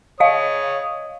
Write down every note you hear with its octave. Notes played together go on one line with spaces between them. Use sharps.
C#5 D#5 F5 D#6